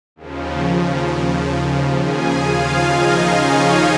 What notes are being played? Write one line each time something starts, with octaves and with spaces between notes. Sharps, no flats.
D#2 C#3 F3
G#4 G#5
F4 F5
D#4 D#5
C#4 C#5